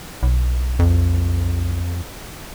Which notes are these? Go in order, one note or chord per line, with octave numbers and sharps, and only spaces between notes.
B1
F2